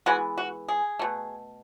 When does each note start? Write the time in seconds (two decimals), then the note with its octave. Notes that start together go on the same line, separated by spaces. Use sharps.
0.06 E3 G#3 B3 F#4
0.38 F#4
0.68 G#4
0.99 B2 A3